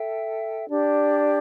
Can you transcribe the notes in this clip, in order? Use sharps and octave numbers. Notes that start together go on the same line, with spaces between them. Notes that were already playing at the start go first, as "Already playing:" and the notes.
Already playing: A4 E5 G5
D4 G4 D5